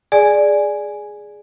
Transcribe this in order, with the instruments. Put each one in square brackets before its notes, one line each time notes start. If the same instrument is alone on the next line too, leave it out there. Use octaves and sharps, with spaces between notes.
[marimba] G#4 D5 G#5